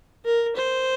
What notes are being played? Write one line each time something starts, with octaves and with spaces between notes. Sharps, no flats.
A#4
C5